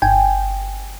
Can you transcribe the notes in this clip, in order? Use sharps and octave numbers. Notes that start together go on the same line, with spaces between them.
G1 G5 G#5